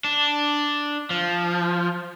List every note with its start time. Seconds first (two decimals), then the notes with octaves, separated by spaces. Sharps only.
0.04 D4
1.10 F3